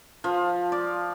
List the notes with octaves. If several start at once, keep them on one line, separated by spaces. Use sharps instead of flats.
F3
D5